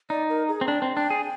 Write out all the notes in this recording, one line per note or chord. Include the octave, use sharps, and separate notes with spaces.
D#4 D5
A#4
G#4
C4
D4 G5
C4
D4 G5
G#4